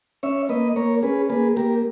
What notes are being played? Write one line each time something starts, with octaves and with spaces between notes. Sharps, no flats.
C#4 C#5 E5
A#3 B4 D#5
A#3 A#4 C#5
C#4 G#4 B4
A#3 G#4 B4
A#3 G4 A#4